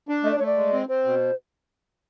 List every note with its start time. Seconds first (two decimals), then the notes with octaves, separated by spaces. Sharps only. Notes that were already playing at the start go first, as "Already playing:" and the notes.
0.08 D4
0.24 A3 D#5
0.31 D5
0.39 A3 C#5
0.46 D5
0.56 G#3
0.73 C4
0.89 C4 C5
1.05 B2